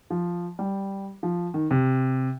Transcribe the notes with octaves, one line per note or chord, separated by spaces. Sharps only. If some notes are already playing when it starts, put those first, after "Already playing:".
F3
G3
F3
D#3
C3